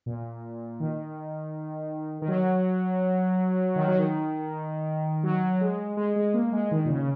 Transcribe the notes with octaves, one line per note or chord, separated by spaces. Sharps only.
A#2
D#3
D#3
F#3
D#3
F#3
D#3
F#3
G#3
G#3
G#3
A#3
G#3
D#3
A#2
C#3